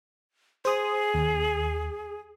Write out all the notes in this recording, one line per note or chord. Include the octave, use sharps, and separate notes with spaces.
G#4 C5 D#6
D#2